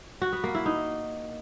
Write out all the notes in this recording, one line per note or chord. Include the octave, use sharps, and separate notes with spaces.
F#4
B3
A#3
E4
D#4